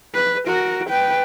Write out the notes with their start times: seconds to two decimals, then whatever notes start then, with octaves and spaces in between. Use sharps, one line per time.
0.14 B4
0.47 F#4 A#4
0.90 B4 G5